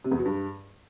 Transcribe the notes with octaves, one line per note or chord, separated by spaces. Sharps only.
C3
E2
F#3
G2